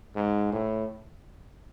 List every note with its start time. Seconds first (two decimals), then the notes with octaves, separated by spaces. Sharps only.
0.15 G#2
0.52 A2